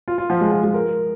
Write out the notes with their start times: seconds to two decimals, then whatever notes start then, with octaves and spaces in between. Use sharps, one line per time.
0.08 F4
0.18 F4
0.30 F3
0.41 G#3
0.52 F3
0.64 G#3
0.74 A#4